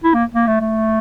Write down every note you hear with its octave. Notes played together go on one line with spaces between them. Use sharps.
E4
A#3
A#3
A3
A3